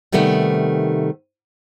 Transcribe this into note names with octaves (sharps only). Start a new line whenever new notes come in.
C3 D#3 G3 A3 B3